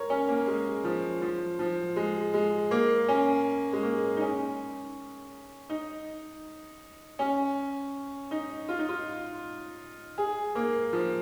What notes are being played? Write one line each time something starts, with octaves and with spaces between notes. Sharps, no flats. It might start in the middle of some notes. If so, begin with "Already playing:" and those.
Already playing: A#4 C#5
C#4
A#3
G#3
F3
F3
F3
G#3
G#3
A#3
C#4
G#3
A#3
D#4
C#4
D#4
C#4
D#4
F4
D#4
F4
G#4
A#3
F3